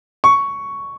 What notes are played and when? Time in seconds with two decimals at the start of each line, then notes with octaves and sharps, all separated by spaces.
0.24 C#6